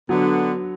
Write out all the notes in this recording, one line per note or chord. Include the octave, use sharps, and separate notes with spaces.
D3 F#3 B3